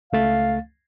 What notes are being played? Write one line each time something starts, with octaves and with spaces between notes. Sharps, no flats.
C#2 A3 F5 A6